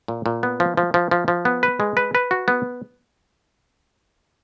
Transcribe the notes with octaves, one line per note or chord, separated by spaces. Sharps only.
A#2
A#2
B3
F3
F3
F3
F3
F3
B3
B4
G#3
B4
B4
F#4
B3